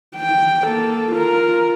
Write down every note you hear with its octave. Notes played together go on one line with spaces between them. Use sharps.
G5
A#3 A4
F4 A#4